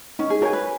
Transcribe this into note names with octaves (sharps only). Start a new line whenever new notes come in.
C#4 D#4
G#4
F#4 A#4 C#5 G#5
B4